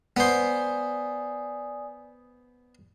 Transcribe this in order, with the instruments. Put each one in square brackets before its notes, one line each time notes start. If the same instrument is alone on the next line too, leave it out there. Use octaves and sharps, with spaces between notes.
[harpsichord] B3 C5 [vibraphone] D5 G#5 D#6